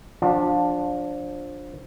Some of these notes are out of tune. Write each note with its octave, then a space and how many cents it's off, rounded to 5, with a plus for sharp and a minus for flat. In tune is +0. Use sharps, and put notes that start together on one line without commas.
F3 +25 D4 +0 F4 +35